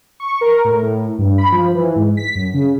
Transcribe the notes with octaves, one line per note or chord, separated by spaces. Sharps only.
C#6
A#4
A2
A2
G2
B5
F3
E3
G#2
B6
F#2
C#3